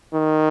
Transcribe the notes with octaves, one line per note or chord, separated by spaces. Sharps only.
D#3